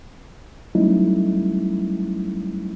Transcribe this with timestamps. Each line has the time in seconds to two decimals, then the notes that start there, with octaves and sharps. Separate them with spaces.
0.75 F#3 G3 A3 C#4 D#4 E4